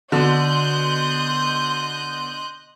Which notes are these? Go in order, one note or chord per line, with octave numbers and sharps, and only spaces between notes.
B2 D3 D#5 C6 F#6 G6